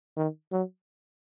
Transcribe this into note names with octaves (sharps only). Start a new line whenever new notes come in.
D#3
F#3